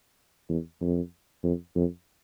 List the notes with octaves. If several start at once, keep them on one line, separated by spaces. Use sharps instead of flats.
E2
F2
F2
F2